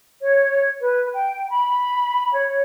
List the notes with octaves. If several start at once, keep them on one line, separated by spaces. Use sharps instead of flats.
C#5
B4
G5
B5
C#5